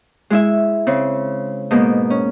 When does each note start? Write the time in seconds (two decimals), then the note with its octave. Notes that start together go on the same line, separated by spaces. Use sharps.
0.30 G#3 E4 E5
0.87 C#3 C4
1.71 G#2 B2 A#3
2.10 C#4